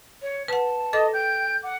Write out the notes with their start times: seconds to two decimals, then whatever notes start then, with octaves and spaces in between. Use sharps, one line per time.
0.22 C#5
0.48 B4 F#5 A5
0.93 A4 D#5 D6
1.13 G5 G6
1.63 F#5 D6